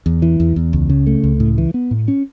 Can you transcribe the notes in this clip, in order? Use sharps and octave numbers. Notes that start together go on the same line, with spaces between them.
E2
E3
E2
E2
C#2
C#3
A3
C#2
A2
E3
B3
A2
C#4